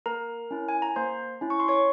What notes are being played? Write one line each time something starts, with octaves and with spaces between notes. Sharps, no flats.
A#3 A#4 A#5
C#4 E4
G#5
A#5
A#3 C5 C6
C#4 E4
C#6
C6
C#5 C#6